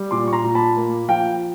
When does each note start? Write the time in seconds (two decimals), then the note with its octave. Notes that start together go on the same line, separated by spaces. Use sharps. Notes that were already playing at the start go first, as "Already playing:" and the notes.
Already playing: G3
0.11 A#2 C6 D6
0.28 C#6
0.33 A#5 C6
0.44 A#2
0.55 A5 B5
0.77 A#3
1.09 F3 F5 G5